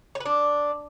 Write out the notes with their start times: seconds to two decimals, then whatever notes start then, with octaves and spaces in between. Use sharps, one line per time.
0.15 C#5
0.20 B4
0.25 D4